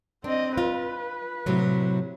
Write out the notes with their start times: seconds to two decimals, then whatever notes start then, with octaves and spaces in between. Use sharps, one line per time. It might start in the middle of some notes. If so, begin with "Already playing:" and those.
0.24 C4 D4 D#5
0.57 F4 B4
1.46 A2 C3 F#3